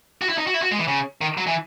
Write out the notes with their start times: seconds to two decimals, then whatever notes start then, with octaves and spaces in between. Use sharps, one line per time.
0.22 F#4
0.29 E4
0.38 D#4
0.47 F#4
0.54 E4
0.63 F#4
0.72 G#3
0.79 E3
0.88 C#3
1.21 D#3
1.38 F#3
1.47 E3